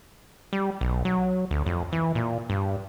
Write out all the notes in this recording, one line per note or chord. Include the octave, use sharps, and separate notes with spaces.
G3
B1
F#3
D2
F2
E3
A#2
G2